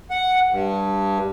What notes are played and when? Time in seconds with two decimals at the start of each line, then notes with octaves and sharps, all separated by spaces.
0.11 F#5
0.50 G2